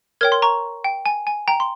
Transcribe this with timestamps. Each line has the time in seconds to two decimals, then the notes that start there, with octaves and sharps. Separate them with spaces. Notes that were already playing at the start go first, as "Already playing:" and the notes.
0.21 A#4 C#5 G5 F6 G#6
0.32 C6
0.42 A#5 C#6
0.84 G5
1.06 G#5
1.27 G#5
1.48 G5 A#5
1.60 C6